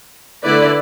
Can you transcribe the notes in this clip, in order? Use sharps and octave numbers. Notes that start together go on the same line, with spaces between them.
D3 A3 E4 B4 D5